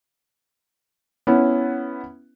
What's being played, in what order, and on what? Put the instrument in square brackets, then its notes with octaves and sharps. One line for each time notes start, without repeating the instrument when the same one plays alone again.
[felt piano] B3 C#4 E4